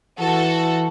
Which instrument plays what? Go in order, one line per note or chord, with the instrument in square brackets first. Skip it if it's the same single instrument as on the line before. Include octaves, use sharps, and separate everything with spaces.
[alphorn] E3 [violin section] F#4 A4